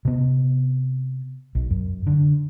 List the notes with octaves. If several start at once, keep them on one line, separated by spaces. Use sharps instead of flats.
C3 B3
B1
F#2
D3